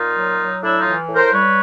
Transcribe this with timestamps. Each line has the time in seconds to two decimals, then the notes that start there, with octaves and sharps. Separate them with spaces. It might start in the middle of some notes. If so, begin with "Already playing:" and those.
Already playing: A#2 D#4 F4
0.16 F#3
0.39 F#3
0.63 A2 D4 E4
0.79 D#4 F4
0.86 E3
1.09 A2
1.15 A#4 C5
1.32 G3 B4 C#5